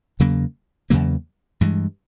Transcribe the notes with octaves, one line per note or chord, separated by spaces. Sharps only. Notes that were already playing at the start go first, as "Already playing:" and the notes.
E2 C#3 F#3 A#3
E2 C#3 F#3 A#3
G2 E3 G#3